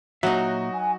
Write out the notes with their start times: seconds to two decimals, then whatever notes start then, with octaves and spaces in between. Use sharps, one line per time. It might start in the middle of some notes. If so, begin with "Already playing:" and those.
0.23 A#2 F#3 D#4 F#4 E5
0.75 G#5